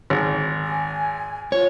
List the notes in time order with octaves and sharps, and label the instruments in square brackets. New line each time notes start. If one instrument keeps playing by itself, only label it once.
[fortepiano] G#1
[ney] G#5
[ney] F4 [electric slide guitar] C#5